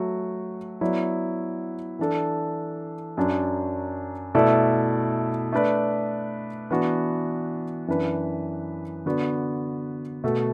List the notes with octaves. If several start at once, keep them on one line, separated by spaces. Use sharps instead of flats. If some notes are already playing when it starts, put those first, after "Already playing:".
Already playing: F#3 A3 F#4
F#3 B3 E4 D5
E3 D4 A4
F#2 F#3 D4
B2 A3 E4 A4 D5
A3 D4 B4 D5
E3 B3 D4 F#4
F#2 E3 D4 B4
D3 B3 F#4 D5
B2 A3 F#4 A4 E5